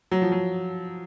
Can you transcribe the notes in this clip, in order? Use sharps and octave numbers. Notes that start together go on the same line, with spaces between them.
F#3
F3
F#3